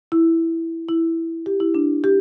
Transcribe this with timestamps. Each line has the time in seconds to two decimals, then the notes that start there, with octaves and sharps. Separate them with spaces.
0.12 E4
0.89 E4
1.46 G4
1.60 E4
1.75 D4
2.04 G4